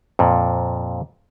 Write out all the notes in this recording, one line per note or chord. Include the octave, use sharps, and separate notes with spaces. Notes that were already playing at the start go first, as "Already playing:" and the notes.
F2 A#2